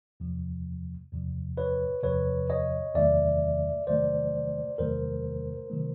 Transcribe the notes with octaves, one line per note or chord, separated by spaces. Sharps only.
E2 C3 F3
E2 C3 F3
B4 C#5
E2 C3 F3 B4 C#5
C#5 D#5
E2 C3 D#3 F#3 A3 D5 E5
E2 C3 D#3 F#3 A3 C5 D5
E2 C3 D#3 F#3 A3 A#4 C5
C3 D#3 F#3 A3